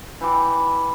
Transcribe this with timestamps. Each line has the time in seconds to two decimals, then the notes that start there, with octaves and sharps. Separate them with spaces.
0.21 E3 G5 D6